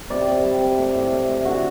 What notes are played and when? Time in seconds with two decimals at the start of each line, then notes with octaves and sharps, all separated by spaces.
0.10 C3 D5
0.27 C3
0.44 G3
0.61 C3
0.78 A3
0.95 A2
1.12 A3
1.28 A3
1.45 D3 F#4